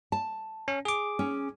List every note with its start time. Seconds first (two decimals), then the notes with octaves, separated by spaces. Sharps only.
0.12 A5
0.68 C#4
0.85 G#4 D6
1.19 C#4